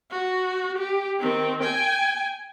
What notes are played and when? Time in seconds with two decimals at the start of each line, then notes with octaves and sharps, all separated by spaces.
0.11 F#4
0.78 G4
1.20 D#3 C4
1.63 G5 G#5